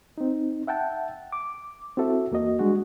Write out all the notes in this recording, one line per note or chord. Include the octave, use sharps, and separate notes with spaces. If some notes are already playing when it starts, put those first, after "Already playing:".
C4 D#4
E5 F#5 G5 A5
D6
C4 E4 F#4 A4 E5
E2 A#3 F#4 D#5
G3 G#3 D4 F#4